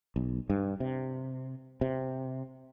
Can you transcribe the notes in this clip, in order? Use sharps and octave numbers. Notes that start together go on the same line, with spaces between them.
B1
G2
C3
C3